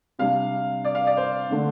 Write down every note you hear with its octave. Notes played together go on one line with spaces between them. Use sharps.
C3 G3 D4 F5
D5
F5
D5
C5
D3 A3 D4